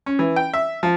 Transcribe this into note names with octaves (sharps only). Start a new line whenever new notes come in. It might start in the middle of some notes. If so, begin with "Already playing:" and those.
C#4
E3
G5
E5
F3